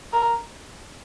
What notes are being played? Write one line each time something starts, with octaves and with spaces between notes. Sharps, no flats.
A#4